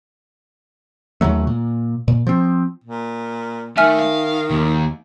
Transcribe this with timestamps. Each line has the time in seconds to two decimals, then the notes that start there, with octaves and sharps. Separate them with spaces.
1.21 D#2 C#3 F#3 A3
1.47 A#2
2.08 A#2
2.27 F3 C4
2.84 A#2
3.77 D#3 A3 E5 G#5 F6
3.99 F5
4.51 D#2